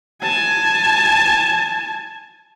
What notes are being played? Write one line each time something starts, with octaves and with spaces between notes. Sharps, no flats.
G#5 A5